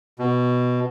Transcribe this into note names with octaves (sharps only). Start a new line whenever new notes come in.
B2